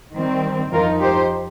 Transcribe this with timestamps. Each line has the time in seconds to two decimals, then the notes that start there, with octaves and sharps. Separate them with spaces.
0.14 D#3 G3 C4
0.72 F2 F3 D#4 F4 A#4
1.01 G4 C5